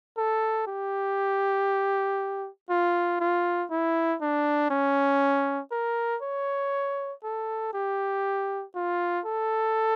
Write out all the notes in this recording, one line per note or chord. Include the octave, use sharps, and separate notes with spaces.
A4
G4
F4
F4
E4
D4
C#4
A#4
C#5
A4
G4
F4
A4